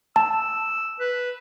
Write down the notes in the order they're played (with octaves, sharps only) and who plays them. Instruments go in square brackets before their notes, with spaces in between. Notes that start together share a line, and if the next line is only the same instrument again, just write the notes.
[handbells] A5 [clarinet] E6
[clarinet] B4